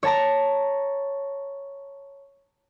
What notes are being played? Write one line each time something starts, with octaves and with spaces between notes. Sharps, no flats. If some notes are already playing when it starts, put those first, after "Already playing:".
C#5 A5 A#5